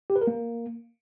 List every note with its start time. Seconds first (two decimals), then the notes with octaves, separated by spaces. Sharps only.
0.10 G4
0.16 B4
0.21 A#4
0.27 A#3